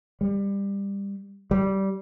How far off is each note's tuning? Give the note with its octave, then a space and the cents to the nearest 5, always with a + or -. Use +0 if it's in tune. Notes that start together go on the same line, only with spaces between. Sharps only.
G3 +20
G3 -15